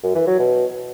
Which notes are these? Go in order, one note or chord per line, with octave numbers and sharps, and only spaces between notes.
F#2
E3
F#3
B2